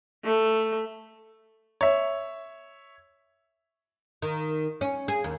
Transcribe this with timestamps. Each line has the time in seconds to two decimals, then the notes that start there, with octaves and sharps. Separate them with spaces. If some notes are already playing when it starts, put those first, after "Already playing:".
0.24 A3
1.81 C#5 E5
4.22 D#3
4.81 C#4
5.08 G#4
5.24 D#2